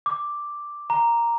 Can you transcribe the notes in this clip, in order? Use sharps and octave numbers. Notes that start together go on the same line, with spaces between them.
D6
A#5